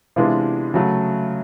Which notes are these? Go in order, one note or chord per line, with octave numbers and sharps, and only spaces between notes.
C3 E3 G#3 B3 D4 F4
C#3 F#3 A3